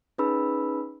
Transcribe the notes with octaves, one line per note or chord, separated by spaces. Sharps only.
C#4 D#4 G#4 B4 B5 E6